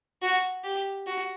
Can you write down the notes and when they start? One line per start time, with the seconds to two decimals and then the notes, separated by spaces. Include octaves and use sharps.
0.22 F#4
0.64 G4
1.07 F#4